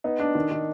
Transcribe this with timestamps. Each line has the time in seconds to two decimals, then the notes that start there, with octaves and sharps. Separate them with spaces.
0.04 B3 D#4
0.19 D4
0.35 D#3
0.51 D#3